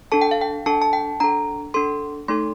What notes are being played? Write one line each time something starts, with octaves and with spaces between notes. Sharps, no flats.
D4 A4 A5
G5
F5
G5
D4 A4 A5
A5
G5
D4 A4 A#5
D4 A4 C6
A3 D#4 A4 C6